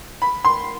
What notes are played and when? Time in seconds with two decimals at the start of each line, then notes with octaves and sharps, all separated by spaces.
0.22 B5
0.45 C6